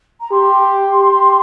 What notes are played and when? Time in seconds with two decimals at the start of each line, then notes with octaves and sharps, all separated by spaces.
0.20 A#5
0.31 G4 C6
0.96 G4